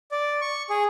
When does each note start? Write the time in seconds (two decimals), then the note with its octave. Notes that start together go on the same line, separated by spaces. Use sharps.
0.11 D5
0.41 C#6
0.70 G#4